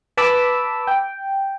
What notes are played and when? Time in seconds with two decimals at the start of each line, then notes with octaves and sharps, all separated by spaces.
0.17 B4 A5 B5 D6 E6
0.87 G5